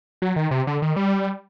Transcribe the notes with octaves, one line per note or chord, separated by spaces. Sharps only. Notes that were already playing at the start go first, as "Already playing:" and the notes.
F#3
D#3
C3
D3
D#3
G3